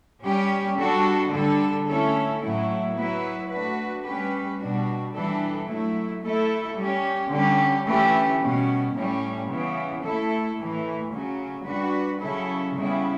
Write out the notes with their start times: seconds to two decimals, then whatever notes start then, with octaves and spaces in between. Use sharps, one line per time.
0.23 G3 C#4 G4
0.78 G3 D4 F#4 A4
1.32 D3 G3 D4 A4
1.86 A3 C#4 E4 A4
2.41 A2 F#3 A3 E4
2.95 F#3 B3 E4 B4
3.50 A3 D4 F#4 B4
4.04 G3 C#4 G4 B4
4.58 B2 G3 D4 F#4
5.13 E3 G3 D4 A4
5.68 F#3 A3 E4
6.23 A3 E4 A4
6.76 G3 C#4 G4
7.30 D3 G3 C#4 G4
7.86 E3 A3 C#4 G4
8.41 B2 G3 C#4
8.95 A2 G3 C#4
9.49 C#3 E3 B3
10.03 A3 E4 A4
10.58 A2 E3 A3
11.12 C#3 F#3 C#4
11.66 G3 D4 F#4 B4
12.20 C#3 F#3 C#4 E4 A4
12.75 C#3 G3 B3 E4